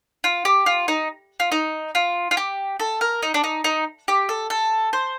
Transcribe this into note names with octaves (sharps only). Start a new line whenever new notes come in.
F4
G4
F4
D#4
F4
D#4
F4
F4
G4
A4
A#4
D#4
D4
D#4
D#4
G4
A4
A4
C5